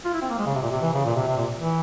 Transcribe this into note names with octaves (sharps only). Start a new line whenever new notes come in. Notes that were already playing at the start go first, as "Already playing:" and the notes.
F4
E4
C4
A#3
G#3
C#3
C3
A#2
C3
E3
C#3
A#2
C3
C3
A#2
E3